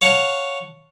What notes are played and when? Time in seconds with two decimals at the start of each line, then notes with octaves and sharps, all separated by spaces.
0.01 C#5 F5 F#5 A5